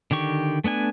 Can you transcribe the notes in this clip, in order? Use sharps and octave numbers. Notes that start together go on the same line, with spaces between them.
D3 D#3 G4 C#6
A3 B3 D4 G#5